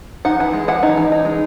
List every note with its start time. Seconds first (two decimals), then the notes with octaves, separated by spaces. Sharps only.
0.25 D#4 F#5
0.40 E3
0.53 G#3
0.68 E3 F#5
0.83 D#4
0.97 E3
1.12 D#4
1.25 G#3